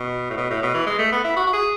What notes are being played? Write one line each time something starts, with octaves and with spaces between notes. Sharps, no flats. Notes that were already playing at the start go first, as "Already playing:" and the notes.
Already playing: B2
A2
B2
A2
B2
E3
G#3
A3
B3
E4
F#4
F#4
G#4